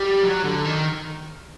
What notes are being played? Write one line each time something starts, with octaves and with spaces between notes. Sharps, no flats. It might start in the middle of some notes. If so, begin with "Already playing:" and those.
Already playing: G3
F#3
D3
D#3